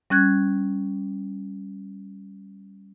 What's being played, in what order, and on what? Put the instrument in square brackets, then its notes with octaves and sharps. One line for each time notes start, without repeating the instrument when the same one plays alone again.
[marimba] G3 C#4 F#6 G#6